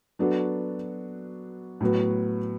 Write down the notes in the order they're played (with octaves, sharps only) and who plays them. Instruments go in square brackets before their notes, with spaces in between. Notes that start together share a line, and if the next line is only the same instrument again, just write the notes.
[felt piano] F#3 B3 D4 F#4 A4
A2 F#3 B3 F#4